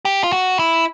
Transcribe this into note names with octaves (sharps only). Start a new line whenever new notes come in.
G4
F4
F#4
E4